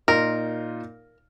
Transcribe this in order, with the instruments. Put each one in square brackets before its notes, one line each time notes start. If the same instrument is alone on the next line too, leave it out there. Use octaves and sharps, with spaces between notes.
[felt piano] A#2 D#4 F4 [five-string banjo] A#4